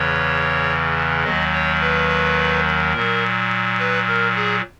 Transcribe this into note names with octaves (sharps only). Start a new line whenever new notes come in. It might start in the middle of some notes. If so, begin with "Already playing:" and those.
Already playing: E2 C#3 E3 C#5
D#2 D#3 F#3 D#5
C#5
B4
A#2 F#3 A#4
B4
A#4
G#4